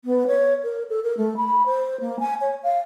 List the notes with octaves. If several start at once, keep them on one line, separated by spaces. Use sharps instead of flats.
B3
C#5
A#4
A4
A#4
A3
B5
C5
A#3
G#5
C#5
F5